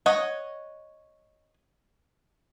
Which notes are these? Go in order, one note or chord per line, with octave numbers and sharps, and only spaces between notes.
C#5 D#5 F#5